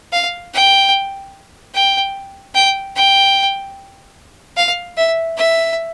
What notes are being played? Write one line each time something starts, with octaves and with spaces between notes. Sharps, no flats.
F5
G5
G5
G5
G5
F5
E5
E5